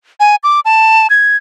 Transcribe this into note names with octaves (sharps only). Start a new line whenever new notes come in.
G#5
D6
A5
G#6